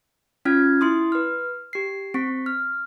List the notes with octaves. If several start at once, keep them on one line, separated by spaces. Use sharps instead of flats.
C#4 F4 F6 G#6
E4 C6 D#6
B4 F6
G4 C7
C4 C#6 B6
F6